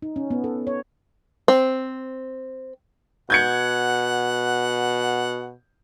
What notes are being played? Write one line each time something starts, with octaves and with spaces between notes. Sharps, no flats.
D#4
C#4
B3
A4
C#5
C4
B2 F#5 G6 G#6 C#7